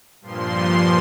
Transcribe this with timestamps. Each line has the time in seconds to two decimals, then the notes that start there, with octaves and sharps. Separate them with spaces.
0.21 G2 A#2 F3 C6